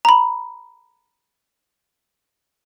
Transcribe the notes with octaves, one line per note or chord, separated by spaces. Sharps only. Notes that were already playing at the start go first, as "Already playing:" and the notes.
A#5 B5